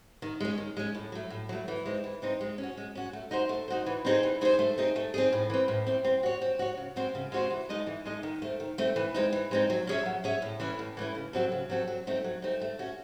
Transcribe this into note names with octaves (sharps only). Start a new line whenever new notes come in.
D#3
G#3 C#4
D#3
G#3 C#4
A2
F#3 A3
A2
F#3 A3
E3
G#3 C4 D#4
E3
G#3 C4 D#4
G#3
C#4
F#4
G#3
C#4 F#4
A3
D#4 F#4 C5
A3
D#4 F#4 C5
E3
C4 D#4 G#4 C5
E3
C4 D#4 G#4 C5
A3
C4 D#4 G#4
A3
C4 D#4 G#4
A2
E3 C4
A2
E3 C4
C4
F#4 C#5
C4
F#4 C#5
C#3
G#3 C4 F#4 C5
C#3
G#3 C4 F#4 C5
E3
G#3 D#4 A4 D#5
E3
G#3 D#4 A4 D#5
D#3
A3 C4
D#3
A3 C4
E3
G#3 C4 D#4
E3
G#3 C4 D#4
F#3
C#4 G#4 C#5 E5
F#3
C#4 G#4 C#5 E5
A2
E3 A3 C#4 E4
A2
E3 A3 C#4 E4
C#3
F#3 C4 F#4 A4
C#3
F#3 C4 F#4 A4
F#3
A3 C4 D#4
F#3
A3 C4 D#4
A3
C#4 F#4